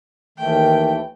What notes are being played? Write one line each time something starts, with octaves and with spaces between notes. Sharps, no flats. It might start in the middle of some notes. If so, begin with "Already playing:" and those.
D#2 D#3 E3 A3 G5